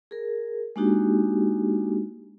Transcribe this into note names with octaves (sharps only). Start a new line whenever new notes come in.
G#4 A#4
G#3 A#3 D4 D#4 F#4 G4